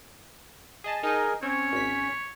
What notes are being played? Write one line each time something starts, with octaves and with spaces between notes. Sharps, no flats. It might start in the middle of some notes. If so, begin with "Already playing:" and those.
G#4 D#5 A5
D#4 G#4 A#4 D#5
C4 C#4 C#5
G#1 B6